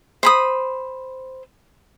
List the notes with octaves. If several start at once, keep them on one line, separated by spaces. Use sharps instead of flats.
C5 B5 D#6